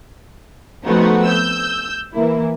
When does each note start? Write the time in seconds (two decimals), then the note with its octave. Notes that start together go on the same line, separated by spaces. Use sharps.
0.85 F3 A3 B3 C4 D#4 F#4
1.25 E6 G6
2.14 E3 A#3 E4